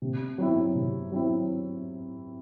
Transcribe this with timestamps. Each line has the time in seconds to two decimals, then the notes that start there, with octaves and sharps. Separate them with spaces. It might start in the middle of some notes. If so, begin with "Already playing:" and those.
0.02 C3
0.38 F#3 C4 E4
0.75 C3
1.12 F#3 C4 E4